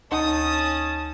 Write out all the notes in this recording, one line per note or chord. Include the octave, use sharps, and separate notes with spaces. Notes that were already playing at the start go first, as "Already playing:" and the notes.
D2 C#4 D#4 A5 D#6